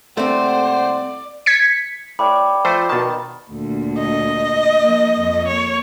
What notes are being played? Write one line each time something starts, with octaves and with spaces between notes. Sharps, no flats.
C2 A3 A#3 C4 C5 D5 F#5
G#6 B6 C#7
A2 D5 G5 B5 D6
F3 A3 C5
B2 D#3 A5
D2 A#2
D#5
F3 A#3
F2
A#3 C#5